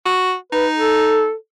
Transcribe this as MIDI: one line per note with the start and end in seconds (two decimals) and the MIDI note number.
0.05 0.35 66
0.52 1.28 63
0.52 0.66 71
0.76 1.33 69